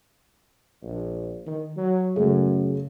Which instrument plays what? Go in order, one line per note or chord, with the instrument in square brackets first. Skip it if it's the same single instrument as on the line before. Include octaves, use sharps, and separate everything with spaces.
[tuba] A#1
D#3
F#3
[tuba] F#2 [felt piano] C#3 A3